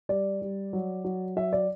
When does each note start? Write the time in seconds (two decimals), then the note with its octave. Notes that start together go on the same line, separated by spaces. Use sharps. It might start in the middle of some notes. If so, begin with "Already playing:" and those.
0.09 G3 D5
0.42 G3
0.73 F#3
1.04 F#3
1.36 F#3 E5
1.53 D5